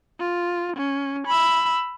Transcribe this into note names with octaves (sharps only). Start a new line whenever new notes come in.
F4
C#4
B5 E6